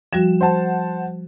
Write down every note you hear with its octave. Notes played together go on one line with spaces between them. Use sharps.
F3 G3 F#4 E7
C5 F#5 A5